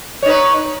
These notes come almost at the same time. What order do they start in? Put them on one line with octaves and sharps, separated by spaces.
C#5 D#4 B4